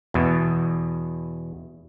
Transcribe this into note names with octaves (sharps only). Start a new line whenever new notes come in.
E2 B2